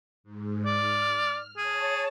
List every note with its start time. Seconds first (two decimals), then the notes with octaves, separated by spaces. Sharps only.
0.24 G#2
0.65 D5 F6
1.57 G#4 C#5 A5